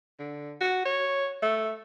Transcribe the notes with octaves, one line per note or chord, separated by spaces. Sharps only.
D3
F#4
C#5
A3